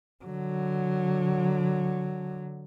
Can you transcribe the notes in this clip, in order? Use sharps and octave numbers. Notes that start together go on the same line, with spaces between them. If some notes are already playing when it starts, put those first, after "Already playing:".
D3 F#3